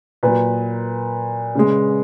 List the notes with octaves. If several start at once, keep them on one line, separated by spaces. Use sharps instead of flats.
A#2 F#3 B4
C#3 G#3